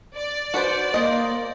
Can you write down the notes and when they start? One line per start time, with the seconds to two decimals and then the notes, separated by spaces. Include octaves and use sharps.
0.15 D5
0.54 F#4 B4 C5
0.94 A#3 C5 D#5